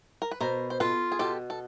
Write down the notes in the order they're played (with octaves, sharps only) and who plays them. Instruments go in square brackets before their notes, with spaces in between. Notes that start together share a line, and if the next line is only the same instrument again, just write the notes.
[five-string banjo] A#4
B4
[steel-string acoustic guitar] B2 [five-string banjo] A#4 C5
[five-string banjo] C5
[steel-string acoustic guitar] F4 [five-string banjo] A4 B4
[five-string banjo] G#4
[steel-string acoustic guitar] B2 [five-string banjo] G4 A4
[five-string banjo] A4